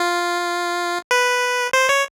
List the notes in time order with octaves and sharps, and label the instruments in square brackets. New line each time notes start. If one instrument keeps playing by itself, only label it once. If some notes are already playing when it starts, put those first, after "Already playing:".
Already playing: [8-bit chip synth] F4
B4
C5
C#5